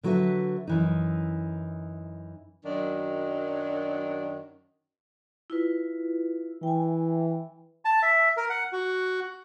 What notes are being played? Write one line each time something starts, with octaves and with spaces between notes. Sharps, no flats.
D3 F#3 F#4 G#4 B4 E5
F#2 E3 D#4
F#2 D#3 F#3 D4
E4 F4 B4
E3 G5 G#5
A5
E5
A#4
F#5
F#4